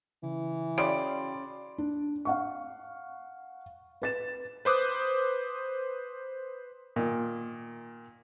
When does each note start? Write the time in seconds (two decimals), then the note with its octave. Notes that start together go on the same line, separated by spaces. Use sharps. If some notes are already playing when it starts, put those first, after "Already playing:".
0.23 C#3 E3
0.78 C#3 F#4 D5 G5 B5 C6 D7
1.78 D4
2.25 F5 F#5 C#6
4.02 B4 A6 E7
4.65 B4 C5 D6 D#6 F#6
6.96 A#2 D#3